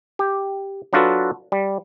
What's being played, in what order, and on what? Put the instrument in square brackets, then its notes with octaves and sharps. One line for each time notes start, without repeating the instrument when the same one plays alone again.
[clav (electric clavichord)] G4
F#3 D4 F4 F#4 A4 B4
G3